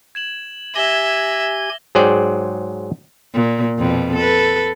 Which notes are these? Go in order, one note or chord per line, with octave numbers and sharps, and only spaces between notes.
G#6 E7 F#7
G4 E5 G#5 G#6 A#6 G7
G#2 F#3 G#4 C5 D5 G5
A#2
F2 B2 B3
A4 B4